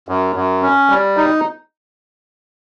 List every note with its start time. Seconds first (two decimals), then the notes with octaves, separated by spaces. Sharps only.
0.09 F#2
0.36 F#2
0.62 C#4
0.90 G3
1.17 D#4